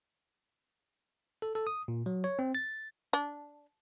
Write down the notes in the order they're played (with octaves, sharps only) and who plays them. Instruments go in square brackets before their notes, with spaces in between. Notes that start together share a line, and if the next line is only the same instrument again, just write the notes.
[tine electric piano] A4
A4
D#6
A#2
F#3
C#5
C4
A6
[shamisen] D4